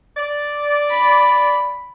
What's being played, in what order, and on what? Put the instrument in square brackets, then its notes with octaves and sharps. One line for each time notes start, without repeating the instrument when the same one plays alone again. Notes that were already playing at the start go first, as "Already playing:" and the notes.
[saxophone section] D5
[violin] B5